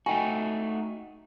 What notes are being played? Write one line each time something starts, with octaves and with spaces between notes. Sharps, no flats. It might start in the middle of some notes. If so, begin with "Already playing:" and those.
A3 D#4 F#4 G5 G#5